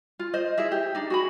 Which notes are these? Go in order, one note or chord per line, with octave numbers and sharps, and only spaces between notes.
F4
C5 D#5
E4 G#4 E5
G4
D4 D#4
F#4 G#4 B5